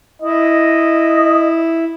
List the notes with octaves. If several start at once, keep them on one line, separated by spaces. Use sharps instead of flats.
E4 D#5